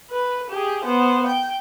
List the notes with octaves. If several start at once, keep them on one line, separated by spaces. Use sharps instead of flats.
B4
G4 G#4
B3 C5
G5